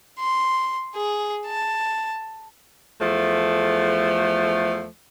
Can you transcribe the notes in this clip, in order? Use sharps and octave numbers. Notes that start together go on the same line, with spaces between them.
C6
G#4
A5
E2 F3 A3